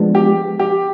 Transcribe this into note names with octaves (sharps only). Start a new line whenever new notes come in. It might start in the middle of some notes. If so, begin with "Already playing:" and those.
Already playing: F3 G#3 B3 D4
G4
G4